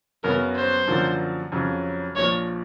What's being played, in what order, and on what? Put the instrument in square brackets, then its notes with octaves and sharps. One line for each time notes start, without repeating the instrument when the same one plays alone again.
[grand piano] F#2 C#3 F#3 B3 [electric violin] A#4
[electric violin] C5
[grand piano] F#2 D3 F3 A#3
F2 C#3 F#3
[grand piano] A#1 A#2 F3 [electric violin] C#5